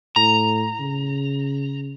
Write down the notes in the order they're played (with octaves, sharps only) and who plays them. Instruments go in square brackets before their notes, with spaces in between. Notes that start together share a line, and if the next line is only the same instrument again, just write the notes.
[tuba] A2 [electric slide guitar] A#5
[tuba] C#3